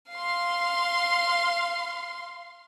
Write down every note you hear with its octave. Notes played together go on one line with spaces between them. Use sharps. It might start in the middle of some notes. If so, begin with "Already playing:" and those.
F5 C6